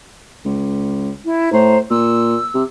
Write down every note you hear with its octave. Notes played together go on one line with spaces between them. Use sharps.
C#2
E4
A2 C5 A#5
A#2 E6
C3